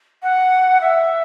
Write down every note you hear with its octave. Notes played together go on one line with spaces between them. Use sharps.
F#5
E5